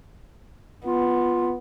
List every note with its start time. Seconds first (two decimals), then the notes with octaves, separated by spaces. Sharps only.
0.86 B3 F4